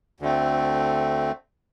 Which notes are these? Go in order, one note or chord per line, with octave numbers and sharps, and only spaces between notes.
D2 D3 A3 C4